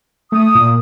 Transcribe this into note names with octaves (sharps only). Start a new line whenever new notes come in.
A3 D#6
A#2